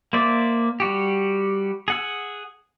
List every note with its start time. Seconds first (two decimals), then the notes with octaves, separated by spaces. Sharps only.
0.13 A#3 C5 D5 E5
0.80 G3 F#4 G4
1.88 G#4 F#5 E6